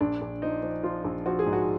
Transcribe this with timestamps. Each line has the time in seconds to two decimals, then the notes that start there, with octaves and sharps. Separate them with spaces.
0.01 A#1 D4
0.21 A#1
0.42 F3 D#4
0.63 F3
0.83 F3 F4
1.04 A#1
1.26 F3 F#4
1.39 G#4
1.46 G#2
1.53 F#4